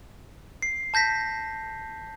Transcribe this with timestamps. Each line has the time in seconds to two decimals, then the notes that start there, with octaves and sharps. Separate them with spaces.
0.62 C7
0.94 A5 G6 A#6 B6